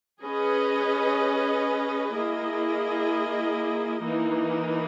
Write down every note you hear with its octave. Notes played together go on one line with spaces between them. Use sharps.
C#4 G#4 B4 D#5
A#3 E4 G#4 D#5
E3 A#3 D#4